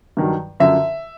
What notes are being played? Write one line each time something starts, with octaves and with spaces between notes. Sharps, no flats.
G2 D#3 F#3
F#2 D3 F3 E5